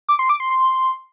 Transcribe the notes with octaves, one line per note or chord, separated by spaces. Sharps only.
D6
C6
D6
C6
C6